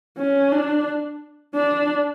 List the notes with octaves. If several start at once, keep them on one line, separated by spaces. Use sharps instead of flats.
C#4
D4
D4